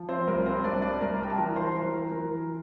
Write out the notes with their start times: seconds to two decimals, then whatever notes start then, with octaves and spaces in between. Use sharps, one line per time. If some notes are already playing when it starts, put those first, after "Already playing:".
Already playing: F3
0.09 C4 C5
0.27 C2 A#4
0.46 C4 C5
0.64 C2 D4 D5
0.82 D4 D5
1.00 C2 A#4 A#5
1.23 G5
1.30 A5
1.37 E3 A#4 A#5
1.56 C5 C6
1.74 E3 A#4 A#5
1.93 A#4 A#5
2.11 E3 A#4 A#5